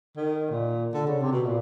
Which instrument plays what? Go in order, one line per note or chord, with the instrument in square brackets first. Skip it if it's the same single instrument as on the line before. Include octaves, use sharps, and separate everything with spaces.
[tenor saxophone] D#3
A#2
D3
C#3
C3
B2
A#2